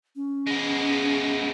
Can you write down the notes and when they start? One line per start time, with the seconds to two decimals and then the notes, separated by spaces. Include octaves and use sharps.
0.16 C#4
0.47 G#3 B3